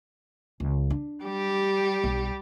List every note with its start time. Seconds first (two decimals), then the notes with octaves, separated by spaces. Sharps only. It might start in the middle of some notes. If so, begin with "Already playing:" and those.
0.60 C#2
0.91 D4
1.23 G3 G4
2.04 B1